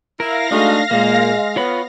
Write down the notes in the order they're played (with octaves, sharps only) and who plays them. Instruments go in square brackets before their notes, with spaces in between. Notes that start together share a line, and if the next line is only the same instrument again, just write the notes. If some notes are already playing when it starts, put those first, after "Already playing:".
[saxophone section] E4 [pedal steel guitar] A#4 [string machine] F5 A#6
[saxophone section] G#3 D#4 F#4 [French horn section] A3 [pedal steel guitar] D4
[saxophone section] A#2 [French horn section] G#3 [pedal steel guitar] A#3
[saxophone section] B3 [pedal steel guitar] F4 C#5 B5